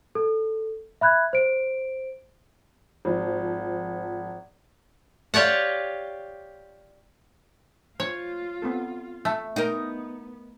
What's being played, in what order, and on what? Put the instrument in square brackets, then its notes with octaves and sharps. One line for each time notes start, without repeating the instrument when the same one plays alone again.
[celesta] A4
E5 B5 F#6 G#6
C5 D7
[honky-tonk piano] G#1 F3
[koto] F4 G4 C#5 D5 F#5
[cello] F4 [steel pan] C5 [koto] C#5
[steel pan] B3 C4 A4
[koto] A3
[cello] B3 [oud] D#4 A#4 [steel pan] G5